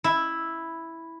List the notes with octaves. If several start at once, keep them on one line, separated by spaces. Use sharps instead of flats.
E4